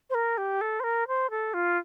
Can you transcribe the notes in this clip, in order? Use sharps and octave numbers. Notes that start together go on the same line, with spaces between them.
C5
A#4
G4
A4
C5
A#4
C5
A4
F4